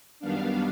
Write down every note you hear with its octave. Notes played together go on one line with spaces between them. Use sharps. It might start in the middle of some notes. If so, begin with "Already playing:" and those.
F#2 D#3 G3 B3 D4 F5